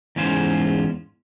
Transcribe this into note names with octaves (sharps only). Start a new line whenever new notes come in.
E2 G#2 C#4 F4 C5